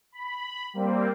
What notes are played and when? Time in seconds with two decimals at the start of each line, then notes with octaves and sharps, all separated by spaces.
0.12 B5
0.74 G3 A#3 C4